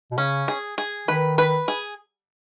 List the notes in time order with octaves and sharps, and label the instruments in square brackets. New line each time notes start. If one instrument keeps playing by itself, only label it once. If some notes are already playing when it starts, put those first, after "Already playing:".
[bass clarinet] B2
[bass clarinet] C#3 [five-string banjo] C#4
[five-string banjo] G#4
G#4
[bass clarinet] D#3 [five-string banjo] B4
[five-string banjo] B4
G#4